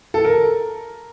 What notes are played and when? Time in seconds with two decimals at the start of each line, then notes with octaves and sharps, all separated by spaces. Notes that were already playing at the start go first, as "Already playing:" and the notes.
0.14 A4
0.25 A#4